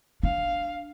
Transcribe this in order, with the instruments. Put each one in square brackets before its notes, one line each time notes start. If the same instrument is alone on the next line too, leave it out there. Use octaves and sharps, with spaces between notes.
[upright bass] D4 [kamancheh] F5